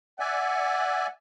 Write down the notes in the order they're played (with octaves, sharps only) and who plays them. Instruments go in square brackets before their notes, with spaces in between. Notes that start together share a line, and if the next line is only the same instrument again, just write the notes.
[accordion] D5 E5 G#5 [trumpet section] F#5